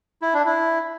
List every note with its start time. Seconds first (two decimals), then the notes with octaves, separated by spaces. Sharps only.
0.22 E4
0.34 D4
0.46 E4